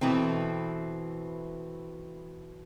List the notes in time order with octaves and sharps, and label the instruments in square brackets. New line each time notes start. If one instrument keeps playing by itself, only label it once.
[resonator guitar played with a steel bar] B2 E3 A3 C4